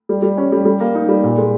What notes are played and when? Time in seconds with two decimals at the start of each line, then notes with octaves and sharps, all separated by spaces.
0.09 G3
0.22 G3
0.38 C#4
0.52 G3
0.65 G3
0.80 A#3
0.95 D#4
1.09 G3
1.24 A#2
1.37 G#3